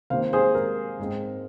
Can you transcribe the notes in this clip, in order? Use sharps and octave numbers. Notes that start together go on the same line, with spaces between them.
C3 D#3 A#3 C5 F5
G#4 C5
A#4
G#2 G#3 C4